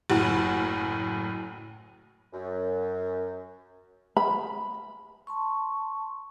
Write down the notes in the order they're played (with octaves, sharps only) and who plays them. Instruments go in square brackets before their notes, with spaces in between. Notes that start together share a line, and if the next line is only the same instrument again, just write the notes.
[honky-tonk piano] F#1 F#2 A2 F#4
[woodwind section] F#2
[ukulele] B5
[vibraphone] A5 C6 C#6